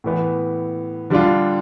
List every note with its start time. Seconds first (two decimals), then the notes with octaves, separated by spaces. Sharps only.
0.04 A2 E3 B3
1.10 D3 G3 D4 F4